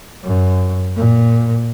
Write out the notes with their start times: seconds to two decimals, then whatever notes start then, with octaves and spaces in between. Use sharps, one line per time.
0.24 F#2
0.96 A#2